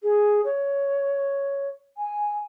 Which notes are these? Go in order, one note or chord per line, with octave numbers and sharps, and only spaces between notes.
G#4
C#5
G#5